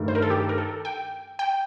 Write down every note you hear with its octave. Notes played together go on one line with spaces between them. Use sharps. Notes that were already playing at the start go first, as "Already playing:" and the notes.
Already playing: G2 D#3 A3
C5
A#4
A4
G4
A#4
A4
G5
G5